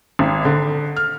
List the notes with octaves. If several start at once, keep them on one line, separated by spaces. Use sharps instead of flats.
G#1
D3
F6